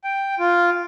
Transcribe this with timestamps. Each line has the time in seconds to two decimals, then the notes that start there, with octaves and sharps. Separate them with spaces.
0.04 G5
0.39 F4